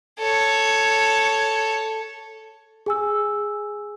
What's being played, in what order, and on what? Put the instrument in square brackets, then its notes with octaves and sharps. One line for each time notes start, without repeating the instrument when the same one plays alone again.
[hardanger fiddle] A4 C#5
[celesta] G#4 G#5 E6